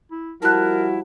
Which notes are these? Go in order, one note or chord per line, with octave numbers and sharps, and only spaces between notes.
E4
F3 G3 E4 F#4 A#4 A5 F#6